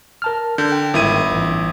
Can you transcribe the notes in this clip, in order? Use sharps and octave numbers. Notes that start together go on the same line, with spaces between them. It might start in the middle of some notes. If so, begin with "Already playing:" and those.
A#4 A5 F6
D3 G6
G5
G1 G#2 D#3 E4 D#7
A1